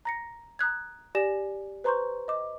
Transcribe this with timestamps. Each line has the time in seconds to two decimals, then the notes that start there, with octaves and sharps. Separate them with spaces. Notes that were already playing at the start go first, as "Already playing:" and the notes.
0.05 A#5 A#6 C#7
0.59 A#5 D#6 F#6 G#6
1.15 G4 D5 G#5 A#6 E7
1.84 B4 C5 A#5 C6 C#6 G6
2.28 D#5 D6